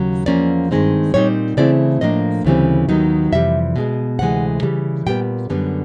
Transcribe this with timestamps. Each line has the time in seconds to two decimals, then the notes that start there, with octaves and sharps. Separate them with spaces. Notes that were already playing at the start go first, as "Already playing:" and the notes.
Already playing: D#2 C#3 F#3
0.26 E2 C3 F3 A#3 C#4 D5
0.71 G2 D#3 G#3 C4 D#4
1.14 A#2 G3 C4 D#4 C#5
1.57 C#3 E3 A3 C4 E4 D5
2.01 A2 F3 A#3 D4 D#5
2.44 D2 C#3 E3 G3 C4
2.89 D#2 D#3 F#3 B3 D#4
3.32 F2 C3 E3 G3 E5
3.76 B2 G#3 B3
4.19 D2 C3 E3 G#3 F#5
4.63 C#3 E3 G3
5.06 A#2 G3 B3 G5
5.50 F#2 D3 G3 B3